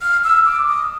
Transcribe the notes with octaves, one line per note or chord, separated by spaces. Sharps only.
F6
E6
D6
D#6